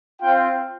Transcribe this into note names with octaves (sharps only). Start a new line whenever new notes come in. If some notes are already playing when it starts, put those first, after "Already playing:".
C4 F4 G5